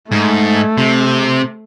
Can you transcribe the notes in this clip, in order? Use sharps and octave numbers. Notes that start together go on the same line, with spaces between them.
G#2 A3
C3